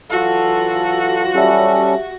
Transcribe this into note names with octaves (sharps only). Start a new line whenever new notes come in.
E3 F#3 F4 F#4 A4
G3 C#4 G4 A4 E5